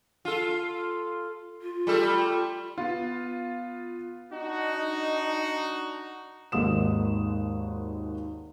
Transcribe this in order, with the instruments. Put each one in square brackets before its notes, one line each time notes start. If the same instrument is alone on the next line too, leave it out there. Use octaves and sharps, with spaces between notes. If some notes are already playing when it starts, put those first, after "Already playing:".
[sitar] F4 A4
[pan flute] F4
[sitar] G3 A3 A4
[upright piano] B3 F4
[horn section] D4 D#4 F#4
[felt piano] G#1 D#2 G#3 D#6 E7